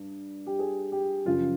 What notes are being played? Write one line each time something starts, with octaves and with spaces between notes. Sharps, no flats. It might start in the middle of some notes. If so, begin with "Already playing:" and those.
Already playing: G2
G4
G#4
G4
F#2 C#3 F3 F4